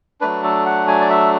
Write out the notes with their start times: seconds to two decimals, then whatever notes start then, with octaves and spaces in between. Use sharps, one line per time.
0.21 F#3 A3 D4 B4
0.44 A4
0.66 F#5
0.88 G#5
1.01 D5
1.10 E5